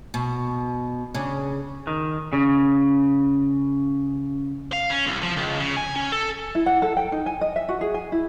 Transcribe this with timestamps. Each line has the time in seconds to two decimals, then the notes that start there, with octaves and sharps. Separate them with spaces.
0.14 B2
1.15 C#3 D4
1.87 D#3
2.33 C#3
4.72 F5
4.90 C#4
5.06 C2
5.22 F3
5.36 C#2
5.60 C#3
5.77 G#5
5.96 C#4
6.12 A4
6.55 E4
6.66 F#5
6.82 A4
6.97 G5
7.12 D#4
7.26 G#5
7.41 D#5
7.56 E5
7.69 F#4
7.81 G#4
7.94 G#5
8.12 E4